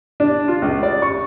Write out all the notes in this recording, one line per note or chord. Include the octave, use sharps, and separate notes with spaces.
D4
F4
C#2
D5
C#6